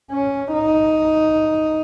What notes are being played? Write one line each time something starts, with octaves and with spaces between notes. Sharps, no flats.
C#4
D#4